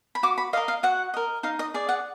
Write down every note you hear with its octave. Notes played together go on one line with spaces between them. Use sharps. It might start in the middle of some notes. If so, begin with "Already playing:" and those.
B5
F#4 D6
B5
A#4 D#5 F5
F5
F#4 F#5
A#4 D#5
D#4 F5
D#5
G#4 D5
F#5